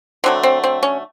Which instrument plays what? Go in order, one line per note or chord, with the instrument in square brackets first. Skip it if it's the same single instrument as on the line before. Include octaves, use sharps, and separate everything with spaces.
[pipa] D3 F#3 A3 C4
C4
C4
C#4